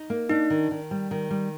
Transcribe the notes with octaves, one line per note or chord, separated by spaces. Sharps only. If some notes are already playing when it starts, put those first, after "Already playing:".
Already playing: D#4
A#3
D4 D#4
D#3
D#3
G3
D#3
G3